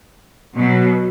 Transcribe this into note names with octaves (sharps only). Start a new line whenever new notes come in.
B2 F#3